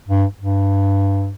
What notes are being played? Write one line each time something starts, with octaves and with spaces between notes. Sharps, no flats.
G2
G2